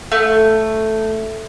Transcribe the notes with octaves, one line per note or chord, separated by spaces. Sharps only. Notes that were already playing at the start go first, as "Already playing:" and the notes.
A3